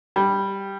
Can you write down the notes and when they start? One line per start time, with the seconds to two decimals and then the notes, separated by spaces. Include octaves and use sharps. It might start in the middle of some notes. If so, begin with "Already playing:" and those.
0.16 G3